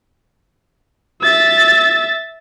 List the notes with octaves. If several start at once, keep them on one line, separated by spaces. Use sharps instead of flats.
E5 A6